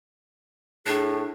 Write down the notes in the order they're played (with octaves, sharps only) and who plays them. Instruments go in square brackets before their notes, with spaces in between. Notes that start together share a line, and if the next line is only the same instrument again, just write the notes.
[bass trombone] A2 [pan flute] D4 [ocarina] G#4